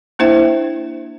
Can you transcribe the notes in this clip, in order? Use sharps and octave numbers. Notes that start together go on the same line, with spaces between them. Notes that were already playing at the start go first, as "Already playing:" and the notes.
A#3 D4 E4 C5 E5 G5